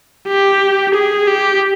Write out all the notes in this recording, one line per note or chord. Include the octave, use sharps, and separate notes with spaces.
G4
G#4
G4